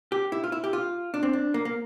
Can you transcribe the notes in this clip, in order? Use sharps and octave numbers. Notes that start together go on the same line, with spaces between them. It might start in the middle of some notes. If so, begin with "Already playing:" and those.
G4
E4
F4
E4
G4
F4
D4
C4
D4
A#3
A#3